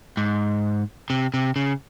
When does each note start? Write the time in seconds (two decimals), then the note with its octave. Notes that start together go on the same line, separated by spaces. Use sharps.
0.17 G#2
1.10 C3
1.34 C3
1.56 C#3